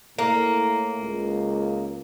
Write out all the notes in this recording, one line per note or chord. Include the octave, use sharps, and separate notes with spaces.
A2 A#3
C#2